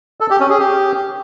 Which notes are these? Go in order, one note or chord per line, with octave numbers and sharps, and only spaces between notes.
A4
G4
C#4
G#4
G4